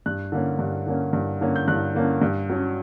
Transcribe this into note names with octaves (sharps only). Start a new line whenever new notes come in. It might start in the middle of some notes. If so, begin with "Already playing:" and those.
G2 F#6
D3 A#3 C#4
G2
D3 A#3 C#4
G2
D3 A#3 C#4
G6
G2 F#6
D3 A#3 C#4
G2
F#3 C#4